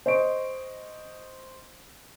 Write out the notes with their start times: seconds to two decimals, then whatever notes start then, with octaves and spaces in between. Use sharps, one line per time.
0.06 C5 D#5 C#6 D7